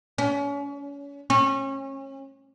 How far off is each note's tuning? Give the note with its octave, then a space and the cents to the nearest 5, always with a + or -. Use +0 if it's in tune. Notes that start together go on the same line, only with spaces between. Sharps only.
C#4 +35
C#4 -30